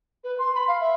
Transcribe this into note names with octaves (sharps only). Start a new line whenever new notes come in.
B4
C6
B5
F5
E5